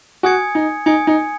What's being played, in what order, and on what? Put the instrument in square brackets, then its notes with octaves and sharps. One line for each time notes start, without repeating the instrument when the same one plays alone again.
[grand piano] F#4 [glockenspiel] G#5 D#6 G#6 C#7
[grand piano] D#4
[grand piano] D#4 [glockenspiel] G#5 D#6 G#6 C#7
[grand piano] D#4